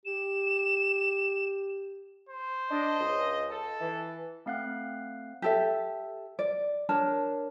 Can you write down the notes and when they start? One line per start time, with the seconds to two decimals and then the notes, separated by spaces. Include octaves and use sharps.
0.05 G4 E7
2.29 C5
2.70 D4 D#5
3.01 C#2
3.51 A4
3.80 E3
4.46 A3 C4 F5 F#5 F#6
5.42 G4 A4 E5
6.39 D5
6.89 D4 A#4 C#5 A5